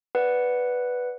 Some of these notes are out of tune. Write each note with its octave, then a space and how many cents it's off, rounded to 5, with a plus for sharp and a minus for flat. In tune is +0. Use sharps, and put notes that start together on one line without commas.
B4 +0 D5 +0 F#5 +0